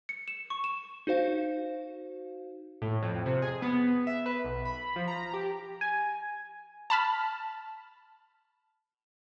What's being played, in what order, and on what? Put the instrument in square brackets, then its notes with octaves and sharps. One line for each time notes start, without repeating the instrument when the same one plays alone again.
[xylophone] C#7
E7
C#6
E7
[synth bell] D#4 F#4 C5 F5
[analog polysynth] A2
F2
C3
G#4
B3
E5
B4
B1
B5
F3
A#5
G4
[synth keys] G#5
[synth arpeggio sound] A5 B5 F6